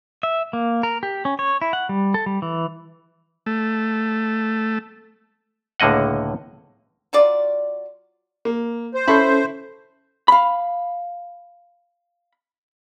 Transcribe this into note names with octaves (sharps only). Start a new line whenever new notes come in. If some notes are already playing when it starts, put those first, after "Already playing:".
E5
A#3
A#4
G4
C#4
C#5
E4
F#5
G3
A4
G3
E3
A3
C#2 A2 D3 A#3 D#5 F#5
F#3 F4 D5
A#3
C5
C#4 E4 A4 B5 C#6 G6
F5 B5